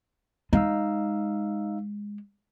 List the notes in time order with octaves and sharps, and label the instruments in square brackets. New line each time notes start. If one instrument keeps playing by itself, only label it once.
[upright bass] G#3 [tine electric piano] D#4 F5 E6